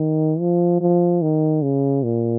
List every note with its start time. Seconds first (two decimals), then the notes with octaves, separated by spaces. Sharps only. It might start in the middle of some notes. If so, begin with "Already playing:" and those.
Already playing: D#3
0.40 F3
0.81 F3
1.22 D#3
1.62 C#3
2.04 A#2